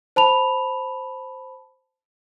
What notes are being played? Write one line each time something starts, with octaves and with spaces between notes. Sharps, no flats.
C5 A5 B5 F7